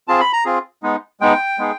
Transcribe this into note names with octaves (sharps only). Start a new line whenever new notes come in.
C4 F4 G#4 A5
B5
A#5
C4 F4 G#4
G#3 B3 D#4
G#3 B3 D#4 G5
G#3 B3 D#4 G#4